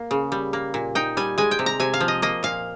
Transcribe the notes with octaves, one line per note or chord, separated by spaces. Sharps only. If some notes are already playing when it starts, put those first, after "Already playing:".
Already playing: A#3
C#3
G3
A#3
A#2
D#4 G5
G3 G#5
G#3 G#5
G5
C3
A#5
C3 G#5
F5
F3
D#5
A#3 D#5
A#2 F5